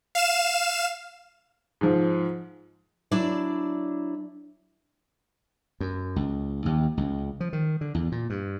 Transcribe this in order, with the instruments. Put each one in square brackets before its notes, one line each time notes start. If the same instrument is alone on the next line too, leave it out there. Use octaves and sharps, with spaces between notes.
[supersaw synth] F5 E7
[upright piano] G#2 F3
[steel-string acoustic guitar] F#3 D4 E4 D5
[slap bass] F#2
C#2
D#2
C#2
F3
D#3
D3
E2
A#2
G2